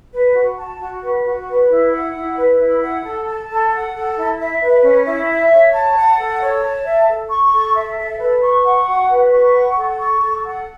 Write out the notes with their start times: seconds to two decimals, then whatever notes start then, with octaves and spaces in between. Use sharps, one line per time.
0.12 B4
0.34 F#4
0.57 A5
0.79 F#4
1.02 B4
1.24 F#4
1.47 B4
1.69 E4
1.91 F#5
2.14 E4
2.36 B4
2.58 E4
2.81 F#5
3.03 A4
3.26 A5
3.49 A4
3.70 F#5
3.93 A4
4.15 E4
4.38 E5
4.60 B4
4.83 C#4
5.05 E4
5.27 E5
5.50 C#5
5.72 A5
5.95 F#5
6.17 A4
6.40 C#5
6.62 A5
6.84 E5
7.07 A4
7.29 C#6
7.52 A4
7.74 E5
7.97 A4
8.19 B4
8.41 C#6
8.64 F#5
8.86 F#4
9.09 B4
9.31 C#6
9.54 F#5
9.76 A4
9.98 C#6
10.20 A4
10.43 F#5